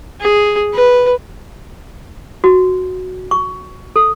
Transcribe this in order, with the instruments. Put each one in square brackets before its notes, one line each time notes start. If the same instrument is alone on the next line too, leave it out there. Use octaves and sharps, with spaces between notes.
[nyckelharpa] G#4
B4
[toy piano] F#4
C#6
A4